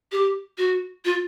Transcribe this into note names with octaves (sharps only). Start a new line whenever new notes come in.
G4
F#4
F4